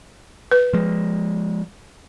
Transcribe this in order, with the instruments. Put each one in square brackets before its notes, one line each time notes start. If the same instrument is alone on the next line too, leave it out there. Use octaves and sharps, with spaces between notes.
[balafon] B4
[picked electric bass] F3 G#3